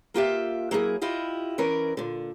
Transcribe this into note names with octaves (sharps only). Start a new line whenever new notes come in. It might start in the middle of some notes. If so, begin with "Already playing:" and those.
A#3 F4 G4 E5
F#3 A#3 E4 G#4
E4 F4 G4 D#5
E3 C#4 A#4 D5
A#2 D3